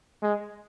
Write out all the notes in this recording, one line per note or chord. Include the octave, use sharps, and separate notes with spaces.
G#3